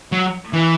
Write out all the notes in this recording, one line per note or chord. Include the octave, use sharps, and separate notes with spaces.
F#3
E3